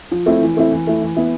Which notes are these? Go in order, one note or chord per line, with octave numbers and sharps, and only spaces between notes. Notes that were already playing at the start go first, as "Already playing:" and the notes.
F3
A3 C4 E4
E3
A3 C4 E4
E3
A3 E4
E3
B3 E4